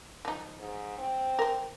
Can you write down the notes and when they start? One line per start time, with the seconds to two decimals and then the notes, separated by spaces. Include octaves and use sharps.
0.25 F3 D#4
0.59 G#2
0.98 C4
1.39 A#4 C5